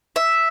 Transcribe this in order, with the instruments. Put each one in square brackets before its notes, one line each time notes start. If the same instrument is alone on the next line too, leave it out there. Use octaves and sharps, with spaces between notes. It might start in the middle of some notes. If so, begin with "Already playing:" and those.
[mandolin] E5